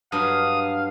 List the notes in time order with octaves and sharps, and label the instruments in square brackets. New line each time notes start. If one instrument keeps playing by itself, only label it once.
[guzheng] G2 F#3 [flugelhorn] F5 [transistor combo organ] D#6